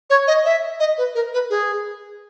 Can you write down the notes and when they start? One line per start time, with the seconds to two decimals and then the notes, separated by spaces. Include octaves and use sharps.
0.10 C#5
0.27 D#5
0.45 E5
0.80 D#5
0.98 B4
1.15 A#4
1.33 B4
1.50 G#4